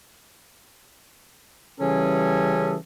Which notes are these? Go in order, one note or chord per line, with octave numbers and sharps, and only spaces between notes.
C#3 E3 G3 C#4 G#4 A4